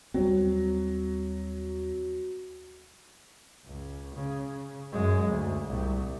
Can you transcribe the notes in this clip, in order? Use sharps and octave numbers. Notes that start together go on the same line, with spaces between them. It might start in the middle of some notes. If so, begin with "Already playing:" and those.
D#2 F#3 G3 C4
C#2
C#3
F#2 G#3
D2
C2 A#2